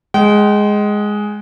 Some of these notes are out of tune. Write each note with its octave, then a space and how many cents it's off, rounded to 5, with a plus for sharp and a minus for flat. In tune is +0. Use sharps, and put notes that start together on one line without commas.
G#3 +0 G5 -40